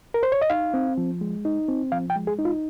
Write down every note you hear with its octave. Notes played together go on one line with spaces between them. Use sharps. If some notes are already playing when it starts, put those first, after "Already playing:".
A#4
C5
C#5
D#5
D#4 F5
C4
F3
G#3
D#4
C4
F3 F5
G5
G#3
G#4
D#4
F4